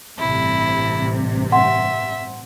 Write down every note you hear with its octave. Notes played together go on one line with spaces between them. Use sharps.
A1 G2 C3 E4
E5 F#5 C6